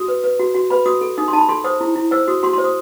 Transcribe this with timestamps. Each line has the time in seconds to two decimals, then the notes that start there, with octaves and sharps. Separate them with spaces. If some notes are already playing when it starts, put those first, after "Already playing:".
Already playing: F#4 D#6
0.08 B4
0.24 B4
0.40 F#4
0.54 F#4
0.70 B4 B5
0.86 F#4 D#6
1.01 A4
1.18 D#4 D#6
1.28 C6
1.33 D#4 A5
1.38 B5
1.49 A4 C6
1.64 C5 D#6
1.81 E4
1.95 E4
2.11 C5 E6
2.27 F#4 D#6
2.43 F#4 C6
2.53 C6
2.58 C5
2.64 D#6